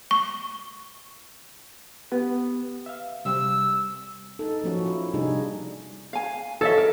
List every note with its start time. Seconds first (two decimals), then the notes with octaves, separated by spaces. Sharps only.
0.11 C#6
2.12 B3 G4 B4
2.86 E5 F5
3.25 C3 G3 C4 E6
4.39 D#4 A4
4.64 F3 A#3 C#4 F#4
4.86 E4
5.14 C3 G3 D4 D#4 G#4
6.13 F5 G#5
6.61 A4 C#5 D#5 E5
6.78 A#4